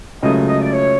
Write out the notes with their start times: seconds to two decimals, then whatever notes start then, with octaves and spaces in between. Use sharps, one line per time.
0.22 C#2 C#3 F#3 A3 D#5
0.48 D#5
0.60 D5
0.72 C#5